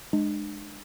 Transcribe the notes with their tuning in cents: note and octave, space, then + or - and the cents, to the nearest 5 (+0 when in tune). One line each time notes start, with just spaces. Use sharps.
G#3 +5 D4 +35